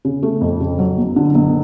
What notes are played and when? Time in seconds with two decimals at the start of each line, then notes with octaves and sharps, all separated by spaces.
0.05 C#3
0.23 A3
0.41 F2
0.60 C#3
0.79 F#3
0.98 F#1
1.16 D3
1.35 F#1